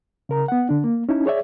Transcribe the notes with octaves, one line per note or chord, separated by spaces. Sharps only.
C#3 A#4 A#5
B3 F#5
D3 D4
A#3
C#4 D#4 E4
G#4 C#5 D5 E5